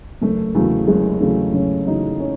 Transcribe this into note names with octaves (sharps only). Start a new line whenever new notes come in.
F#1 A3
E2 C#3 F#3 A3
F#1 G#3
E2 C#3 F#3 A3
F#1 C#4
E2 C#3 F#3 D#4
C#4